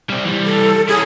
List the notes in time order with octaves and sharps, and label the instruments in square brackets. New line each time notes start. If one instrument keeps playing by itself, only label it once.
[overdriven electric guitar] G3 C4
E3 G3
[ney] A4
[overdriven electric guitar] C#4 E4 [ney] G#4